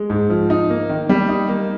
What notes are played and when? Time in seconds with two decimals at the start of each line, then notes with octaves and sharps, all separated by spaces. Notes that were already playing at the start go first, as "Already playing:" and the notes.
Already playing: G#3
0.10 G#2
0.30 F3
0.50 D#4
0.70 A#3
0.89 D#3
1.09 G3
1.28 D#4
1.49 A#3